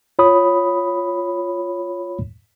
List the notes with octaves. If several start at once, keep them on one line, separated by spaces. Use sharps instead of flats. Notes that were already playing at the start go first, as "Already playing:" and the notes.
F4 C#5 B5 D#6